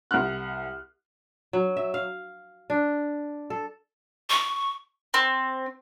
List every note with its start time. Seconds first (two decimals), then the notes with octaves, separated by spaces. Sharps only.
0.11 C2 F#5 F6 F#6
1.53 F#3
1.77 E5
1.94 F5
2.70 D4
3.50 A4
4.30 C#6
5.14 C4